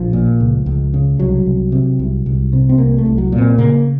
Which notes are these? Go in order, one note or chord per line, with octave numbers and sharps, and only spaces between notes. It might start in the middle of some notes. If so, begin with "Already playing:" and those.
Already playing: A#1 F3
A#2
C#2
C#2
C#3
C2 F#3
C2
C3
C2
C2
C3
C4
C2 A#3
A3
C2
F#3
A#2
C4
C#3 A#3